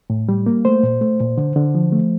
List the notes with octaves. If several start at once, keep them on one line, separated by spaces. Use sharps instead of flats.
A2
G3
A#3
A3 C5
A#2
A3
A#2
D3
D3
F3
A3